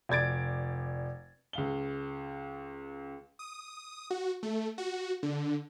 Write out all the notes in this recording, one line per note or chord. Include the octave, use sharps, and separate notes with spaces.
F1 D5 G#6 A6 D7
C#2 F5 G7
D#6
F#4
A3
F#4
D3